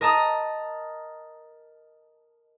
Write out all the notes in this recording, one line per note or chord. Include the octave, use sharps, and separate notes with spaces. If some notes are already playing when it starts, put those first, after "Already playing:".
A#4 D#5 A5 A#5 D#6